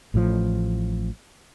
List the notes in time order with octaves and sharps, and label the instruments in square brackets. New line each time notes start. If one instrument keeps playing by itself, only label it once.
[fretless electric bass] A1 A2 C3 F3